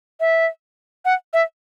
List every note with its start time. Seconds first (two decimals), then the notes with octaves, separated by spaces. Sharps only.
0.20 E5
1.05 F#5
1.33 E5